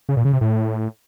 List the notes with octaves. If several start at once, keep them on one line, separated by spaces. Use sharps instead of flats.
C#3
A#2
C#3
C3
A2